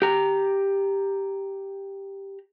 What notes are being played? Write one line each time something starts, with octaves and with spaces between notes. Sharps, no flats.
G4 A#5